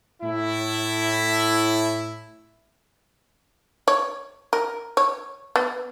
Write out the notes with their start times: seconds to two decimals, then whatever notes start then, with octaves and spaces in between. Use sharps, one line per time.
0.23 A2 E4
3.88 C#5
4.53 A#4
4.97 C#5
5.56 B3